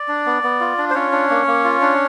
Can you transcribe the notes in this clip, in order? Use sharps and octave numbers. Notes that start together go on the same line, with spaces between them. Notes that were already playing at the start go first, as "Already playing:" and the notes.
Already playing: D5
D4
B3
B3
F4
D4
C5
C#4 F4 C#5
D4
A#3
A#3
F4
D4